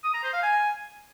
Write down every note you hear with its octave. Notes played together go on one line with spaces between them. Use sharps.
D#6
A#5
C5
F5
G#5